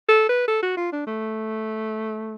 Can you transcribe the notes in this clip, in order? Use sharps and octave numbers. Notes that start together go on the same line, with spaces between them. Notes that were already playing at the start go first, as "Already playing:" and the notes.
A4
B4
A4
F#4
F4
D4
A3